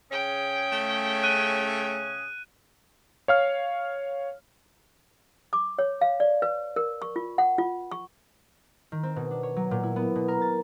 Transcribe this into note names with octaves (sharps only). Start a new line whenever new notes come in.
C#3 C#4 G#4 G5
A3
F#6 D#7
C#5 F5 F6
D6
C#5
F5
D5
B4
A#4
C#6
F4
F#5
F4
C#6
D#3
C4
B2
D4
C#5
F#3
A#2
E4
B3
B2
A#4
A6